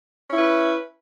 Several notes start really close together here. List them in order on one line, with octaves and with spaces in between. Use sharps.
C#4 E4 B4